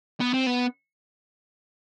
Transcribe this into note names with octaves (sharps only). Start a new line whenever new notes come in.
B3
C4
B3